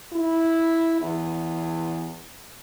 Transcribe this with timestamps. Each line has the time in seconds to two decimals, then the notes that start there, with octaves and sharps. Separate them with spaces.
0.13 E4
1.00 E2